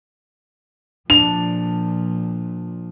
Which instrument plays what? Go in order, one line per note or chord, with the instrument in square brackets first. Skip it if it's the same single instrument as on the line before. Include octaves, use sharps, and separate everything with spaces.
[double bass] A#2 F3 [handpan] D4 [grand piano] F7